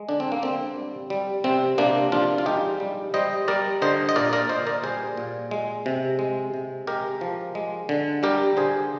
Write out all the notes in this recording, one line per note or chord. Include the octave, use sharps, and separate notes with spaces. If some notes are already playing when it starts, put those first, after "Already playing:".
Already playing: G#3
D3 D4
C4
A#3
D3 C4
G3
G3
C3 C4
C3 A#3 D4
F3 D4 F4
F4
G#3 D#4 G4
G3
G3 C5 D#5
G3 A#4 D5
D3 C5 D#5
D#5
A#2 A#4 D5
A#4 D5
A#2 C5 D#5
A#4 D5
G3 G#4 C5
A#2
G#3
C3
G#3
C3
G#3 G4 A#4
F3
G#3
D3
G3 G4 A#4
D3 G#4 C5